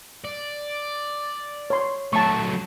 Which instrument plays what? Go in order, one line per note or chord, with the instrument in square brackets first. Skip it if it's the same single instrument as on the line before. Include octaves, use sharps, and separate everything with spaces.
[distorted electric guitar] D5
[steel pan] C#5 C6
[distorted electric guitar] F#3 A3 [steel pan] A5 C#6